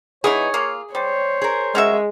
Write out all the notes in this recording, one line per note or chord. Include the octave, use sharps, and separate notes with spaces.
E3 B3 D#4 G#4 C#5
A#3 F4
G3 C5 C#5
G#4 A#4
G#3 C#4 F#4 E5